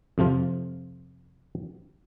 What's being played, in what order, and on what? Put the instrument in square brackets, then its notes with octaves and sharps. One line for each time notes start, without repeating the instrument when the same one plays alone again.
[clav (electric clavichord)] F2 C3 F3 F4